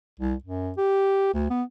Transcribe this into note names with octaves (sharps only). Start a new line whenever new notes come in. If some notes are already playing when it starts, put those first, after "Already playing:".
C2
F#2
G4
D2
B3